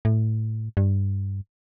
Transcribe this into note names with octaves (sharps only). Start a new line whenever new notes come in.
A2
G2